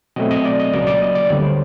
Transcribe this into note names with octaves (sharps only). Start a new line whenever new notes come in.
B2 F#3 A3 C4 D#5
D#5
D5
D#5
C#2 C#3 F#3 A#3 D5
D5
D#5
D5
D2 D3 G3 B3 C#5
C5